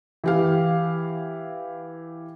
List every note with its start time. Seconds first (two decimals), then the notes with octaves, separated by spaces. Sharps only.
0.24 E3 G4 F5